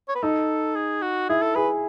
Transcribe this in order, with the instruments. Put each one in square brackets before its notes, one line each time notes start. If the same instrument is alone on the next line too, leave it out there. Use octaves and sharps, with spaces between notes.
[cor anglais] C#5
B4
[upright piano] D#4 [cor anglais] A4
[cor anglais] G#4
F#4
[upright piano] E4 [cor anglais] G#4
[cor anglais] A4
[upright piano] G#4 [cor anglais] B4